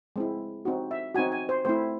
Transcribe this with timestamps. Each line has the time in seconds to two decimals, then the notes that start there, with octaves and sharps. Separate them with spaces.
0.16 G#3 C4 E4
0.65 C4 D#4 F#4
0.91 E5
1.15 C4 D#4 F#4 G#5
1.32 G#5
1.49 C5
1.65 A3 C4 E4 C5